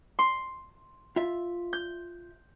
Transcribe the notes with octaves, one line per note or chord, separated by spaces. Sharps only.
C6
F4 E5
G6